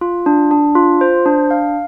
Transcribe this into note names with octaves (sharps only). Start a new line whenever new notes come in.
F4
D4
D4
F4
C5
D4
F5